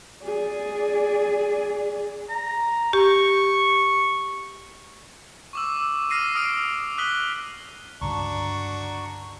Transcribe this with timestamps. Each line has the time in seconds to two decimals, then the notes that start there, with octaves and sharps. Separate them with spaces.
0.24 G#4 D5
2.29 A#5
2.93 G4 C#6
5.53 C#6 D6 E6
6.10 D#6 F6 A#6 C7 D#7
6.35 D#6 F6 D7 D#7
6.98 D#6 F#6 B6 F#7 G7
8.01 C#2 G2 D3 D4 F#4 A#5 C#6